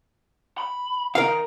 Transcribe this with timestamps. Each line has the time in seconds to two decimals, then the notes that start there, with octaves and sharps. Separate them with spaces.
0.58 B5
1.15 D#3 A#4 F5